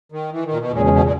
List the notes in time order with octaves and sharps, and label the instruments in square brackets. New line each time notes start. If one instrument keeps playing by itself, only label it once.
[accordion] D#3
E3
D#3
A#2
B2
[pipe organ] E2 C#3 G#3 C#4 G#4 [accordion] A#2
[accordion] B2
B2
A#2